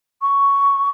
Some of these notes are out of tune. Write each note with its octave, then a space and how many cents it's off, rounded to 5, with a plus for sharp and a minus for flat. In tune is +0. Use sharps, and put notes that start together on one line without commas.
C#6 +5